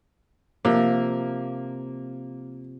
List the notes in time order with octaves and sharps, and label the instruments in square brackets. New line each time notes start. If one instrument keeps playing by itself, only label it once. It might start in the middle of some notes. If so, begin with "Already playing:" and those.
[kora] C3 F3 [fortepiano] A#3